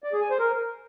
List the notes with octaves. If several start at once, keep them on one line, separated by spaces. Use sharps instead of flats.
D5
G#4
G#5
C5
A#4